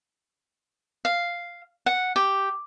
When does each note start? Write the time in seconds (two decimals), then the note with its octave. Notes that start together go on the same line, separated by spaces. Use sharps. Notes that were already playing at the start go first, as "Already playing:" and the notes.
1.05 F5
1.86 F#5
2.16 G4